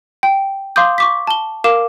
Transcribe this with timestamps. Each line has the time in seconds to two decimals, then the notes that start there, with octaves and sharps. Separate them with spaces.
0.23 G5
0.76 F5 C6 D6 D#6 G6
0.98 C#6 D6 B6
1.27 A5 G7
1.64 A#4 F5 D6 E7